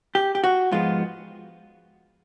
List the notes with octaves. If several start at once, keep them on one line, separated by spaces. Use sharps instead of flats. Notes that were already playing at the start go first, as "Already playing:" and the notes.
G4
G4
F#4
G#2 F3 G#3 B3 F4